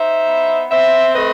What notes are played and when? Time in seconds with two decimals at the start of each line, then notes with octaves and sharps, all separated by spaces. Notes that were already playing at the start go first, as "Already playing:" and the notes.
Already playing: D#4 C5 E5
0.28 B3
0.71 C4 C5 E5
1.14 A3 B4 D#5